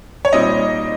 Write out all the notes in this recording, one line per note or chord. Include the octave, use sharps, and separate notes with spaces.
C#5
A#2 G3 C4 D#4 D#5